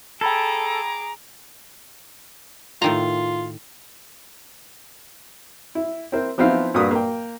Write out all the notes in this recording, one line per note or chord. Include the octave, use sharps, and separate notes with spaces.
G#4 A4 G5 A#5 B5 D6 G#6
A2 D#3 F4 A#5
E4
C4 E4 A#4 C5
F3 B3 C4 D#4 E4 F5
G2 A#2 A#3 F#4 B4 D#6
A#3 G5